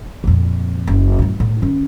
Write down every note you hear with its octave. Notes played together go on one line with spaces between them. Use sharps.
F2 A#2
F#1
F#2 A2
A2
D#3 C#4